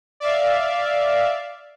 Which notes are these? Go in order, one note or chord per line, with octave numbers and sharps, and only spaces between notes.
D5 E5 F5